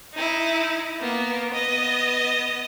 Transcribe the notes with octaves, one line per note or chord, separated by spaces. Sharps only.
D#4 E4
A#3 B3
B3 D#5